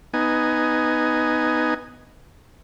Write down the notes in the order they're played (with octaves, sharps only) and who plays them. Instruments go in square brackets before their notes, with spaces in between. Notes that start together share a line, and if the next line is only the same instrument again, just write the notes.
[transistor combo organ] B3 D#4 G#5